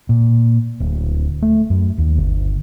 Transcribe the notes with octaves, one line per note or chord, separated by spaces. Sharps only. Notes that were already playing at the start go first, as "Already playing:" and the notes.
A#2
D1
A3
F#2
D#2
G1